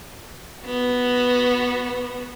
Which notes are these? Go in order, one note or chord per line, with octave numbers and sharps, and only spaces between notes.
B3 F#4